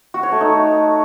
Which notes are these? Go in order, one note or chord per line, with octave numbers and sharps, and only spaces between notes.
F#4
C#5
A3
D#4